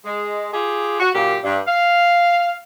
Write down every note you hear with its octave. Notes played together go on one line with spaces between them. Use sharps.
G#3
F4 G4 G#4
F#4
F#2 A#2 A#3 G4
G2
F5